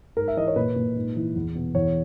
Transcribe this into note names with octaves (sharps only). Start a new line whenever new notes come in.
G#2 A#4
E5
E3 D#5
C#5
A#2 B4
A#2
G#2
E3
E2
B2
E2 C#5